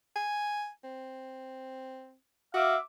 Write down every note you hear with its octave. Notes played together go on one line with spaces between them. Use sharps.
G#5
C4
F#4 E5 F5 D6